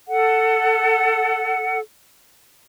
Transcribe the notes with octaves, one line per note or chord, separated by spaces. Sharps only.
A4 F#5